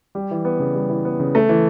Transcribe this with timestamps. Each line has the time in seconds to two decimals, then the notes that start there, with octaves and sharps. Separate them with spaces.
0.15 G3
0.31 E3
0.45 B3
0.60 C#3
0.75 G3
0.89 E3
1.05 B3
1.20 C#3
1.35 A3
1.49 E3